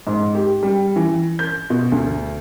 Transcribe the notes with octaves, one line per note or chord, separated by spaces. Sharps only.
G#2
G4
G3
E3
G6
B2
D2